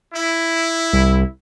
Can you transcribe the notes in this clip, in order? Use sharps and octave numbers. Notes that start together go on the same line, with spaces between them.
E4
C2